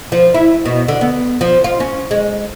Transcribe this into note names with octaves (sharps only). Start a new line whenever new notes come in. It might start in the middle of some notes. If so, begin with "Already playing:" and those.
F3
E4
B2
D3
B3
F3
F4
C#4
G#3